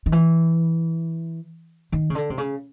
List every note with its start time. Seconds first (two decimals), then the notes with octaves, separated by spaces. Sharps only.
0.06 D#3
0.12 E3
1.92 D#3
2.10 C#3
2.15 D3
2.30 C3
2.38 C#3